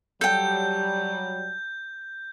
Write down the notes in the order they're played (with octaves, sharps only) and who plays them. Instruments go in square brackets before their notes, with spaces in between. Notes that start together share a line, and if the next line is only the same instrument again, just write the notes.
[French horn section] F#3 G3 [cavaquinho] A4 G5 [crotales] G6